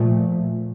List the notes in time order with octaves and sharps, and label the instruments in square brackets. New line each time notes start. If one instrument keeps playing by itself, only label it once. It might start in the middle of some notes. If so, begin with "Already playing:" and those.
Already playing: [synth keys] A#2 F3 A3